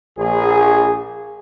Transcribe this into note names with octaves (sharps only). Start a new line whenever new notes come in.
A#1 G#4